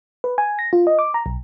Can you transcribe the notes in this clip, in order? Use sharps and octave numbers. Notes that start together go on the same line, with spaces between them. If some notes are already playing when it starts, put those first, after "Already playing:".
B4
G#5
A#6
F4
D#5
D6
A#5
B1